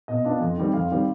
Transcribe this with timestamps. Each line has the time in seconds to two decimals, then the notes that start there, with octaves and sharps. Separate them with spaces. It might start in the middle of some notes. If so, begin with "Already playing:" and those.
0.08 B2 D#5
0.24 B3 D4 F4
0.41 F2
0.57 D#3 G3 C4
0.73 F2 F5
0.91 D#3 G3 C4